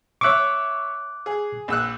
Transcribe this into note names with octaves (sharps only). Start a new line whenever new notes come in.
C#5 E5 C#6 D6 F#6
G#4
A#1 E6 F#6